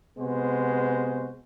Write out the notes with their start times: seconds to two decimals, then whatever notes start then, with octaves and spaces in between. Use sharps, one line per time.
0.19 C3 G#3 B3 F#4 C5